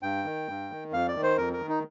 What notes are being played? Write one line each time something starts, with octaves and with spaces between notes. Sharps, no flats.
G2 G5
D#3
G2
D#3
F2 F5
D5
D#3
C5
F2 A#4
A#4
D#3
D#4